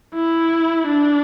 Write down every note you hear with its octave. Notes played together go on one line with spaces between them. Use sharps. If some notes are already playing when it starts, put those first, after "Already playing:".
E4
D4